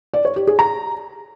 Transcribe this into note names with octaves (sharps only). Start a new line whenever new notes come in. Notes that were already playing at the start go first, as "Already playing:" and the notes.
D5
C#5
G4
G#4
A#5